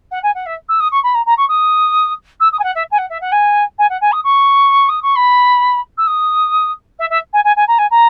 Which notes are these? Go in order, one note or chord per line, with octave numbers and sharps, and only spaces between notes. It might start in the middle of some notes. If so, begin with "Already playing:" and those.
F#5
G#5
F#5
E5
E6
D#6
C#6
B5
A#5
A#5
C#6
D#6
E6
D#6
G#5
F#5
E5
G#5
F#5
E5
F#5
G#5
G#5
F#5
G#5
D#6
C#6
D#6
C#6
B5
E6
D#6
E5
E5
G#5
G#5
G#5
A#5
G#5
A#5